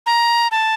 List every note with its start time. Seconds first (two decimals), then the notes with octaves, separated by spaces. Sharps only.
0.06 A#5
0.52 A5